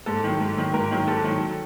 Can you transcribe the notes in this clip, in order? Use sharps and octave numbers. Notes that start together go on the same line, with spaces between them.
G#2 A4
D#3 F#3
G#2
D#3 F#3
G#2 A#4
D#3 F#3
G#2 A4
D#3 F#3